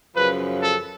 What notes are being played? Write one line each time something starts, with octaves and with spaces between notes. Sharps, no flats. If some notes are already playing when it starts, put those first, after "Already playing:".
F#2 C#3 F3 B4
A4